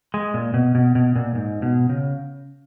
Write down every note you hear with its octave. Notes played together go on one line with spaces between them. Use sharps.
G#3
A#2
B2
B2
B2
A#2
G#2
B2
C#3